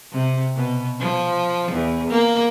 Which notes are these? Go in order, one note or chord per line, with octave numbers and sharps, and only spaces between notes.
C3
B2
F3
E2
A#3